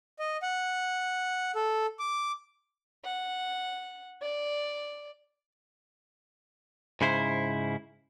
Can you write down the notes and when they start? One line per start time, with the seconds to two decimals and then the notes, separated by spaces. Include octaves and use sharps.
0.19 D#5
0.42 F#5
1.55 A4
1.99 D6
3.05 F#5
4.22 D5
7.01 G#2 C#3 E4 C5